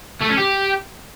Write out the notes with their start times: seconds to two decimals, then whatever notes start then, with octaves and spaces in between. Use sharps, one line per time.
0.22 A3
0.30 C#4
0.38 G4